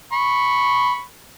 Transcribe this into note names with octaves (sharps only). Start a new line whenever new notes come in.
B5 C#6